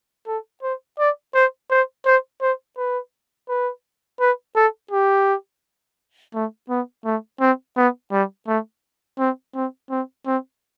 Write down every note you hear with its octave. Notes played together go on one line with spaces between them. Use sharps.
A4
C5
D5
C5
C5
C5
C5
B4
B4
B4
A4
G4
A3
B3
A3
C4
B3
G3
A3
C4
C4
C4
C4